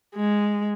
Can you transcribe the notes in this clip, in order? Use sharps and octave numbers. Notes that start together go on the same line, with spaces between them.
G#3